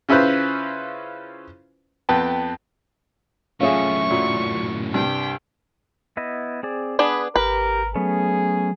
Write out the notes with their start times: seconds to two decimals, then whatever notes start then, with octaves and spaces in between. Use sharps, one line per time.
0.09 C#3 C#4 E4 F4 B4 C5
2.09 F2 B3 G5 A5
3.60 F#2 A2 C#4 F4 G#4 E5 C#6
4.10 A#2 F#3
4.94 C2 G2 G3 G5
6.17 B3 E4 D#5
6.63 C4 G#4 D5
6.99 B3 D4 G#4 B5
7.36 G#1 G4 A#4 B4
7.95 F#3 A3 B3 C#4 G#4